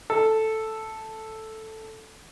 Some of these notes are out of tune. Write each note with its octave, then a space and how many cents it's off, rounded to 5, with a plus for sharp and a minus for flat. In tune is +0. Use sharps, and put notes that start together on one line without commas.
A4 +0